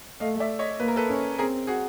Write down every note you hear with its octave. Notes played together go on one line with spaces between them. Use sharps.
A3 D#5 F5
D5 E5
C#5 D#5
A#3 B4
A#4
A4 B4
C#4
C4 G#4 A#4
F#4 G#4